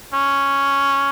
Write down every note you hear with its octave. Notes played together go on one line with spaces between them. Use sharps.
C#4